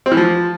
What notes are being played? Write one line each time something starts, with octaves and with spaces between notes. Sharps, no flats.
C4
E3
F3